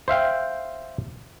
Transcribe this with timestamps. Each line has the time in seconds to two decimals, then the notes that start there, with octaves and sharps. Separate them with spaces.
0.08 C5 E5 F5 G5